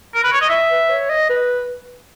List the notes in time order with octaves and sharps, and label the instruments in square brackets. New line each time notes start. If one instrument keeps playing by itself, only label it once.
[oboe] A#4
B4
C#5
D#5
E5
[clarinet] B4
C#5
D#5
B4